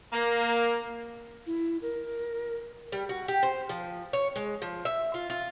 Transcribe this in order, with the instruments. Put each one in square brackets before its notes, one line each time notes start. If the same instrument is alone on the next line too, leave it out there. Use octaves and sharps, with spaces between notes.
[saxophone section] A#3
[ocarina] E4
A#4
[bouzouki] G3
F#4
G4
C5
F3
C#5
G#3
F3
E5
F4
F4